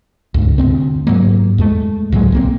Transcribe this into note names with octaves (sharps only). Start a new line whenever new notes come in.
C#2 G2
D2 C3 B3 C4
G#2 F#3 A#3
E2 G#3 A3
C#2 A2 F#3 G#3
B1 A#3 C4